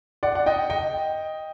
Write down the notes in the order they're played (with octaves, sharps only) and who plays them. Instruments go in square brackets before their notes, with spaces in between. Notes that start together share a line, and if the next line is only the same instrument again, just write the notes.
[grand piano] D5 F#5
F#5
D#5 G5
D#5 G5